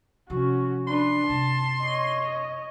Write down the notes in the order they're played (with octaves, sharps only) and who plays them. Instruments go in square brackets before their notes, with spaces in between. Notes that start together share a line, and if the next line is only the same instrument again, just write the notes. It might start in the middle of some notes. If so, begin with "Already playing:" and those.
[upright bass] C3 F3 [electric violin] C#4 F#4
[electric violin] D4 B4 [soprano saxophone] C6
[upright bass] F#2 C3 [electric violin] A5
[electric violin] C#5 D#5